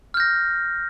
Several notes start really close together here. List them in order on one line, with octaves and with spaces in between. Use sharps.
F6 G6 A#6